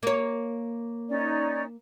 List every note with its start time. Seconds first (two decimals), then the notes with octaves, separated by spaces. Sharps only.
0.03 A#3 C#5
1.08 C#4 D#4 D5